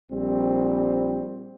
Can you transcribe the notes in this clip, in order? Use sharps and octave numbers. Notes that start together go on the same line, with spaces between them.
A#1 G3 C4